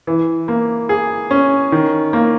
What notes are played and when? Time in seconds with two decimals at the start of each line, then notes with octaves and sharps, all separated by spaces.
0.07 E3
0.48 A#3
0.89 G#4
1.31 C#4
1.72 D#3
2.13 A#3